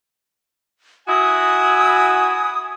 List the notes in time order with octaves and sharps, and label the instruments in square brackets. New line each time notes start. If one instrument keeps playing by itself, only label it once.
[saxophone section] E4 F#4 [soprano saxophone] G#5 [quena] D#6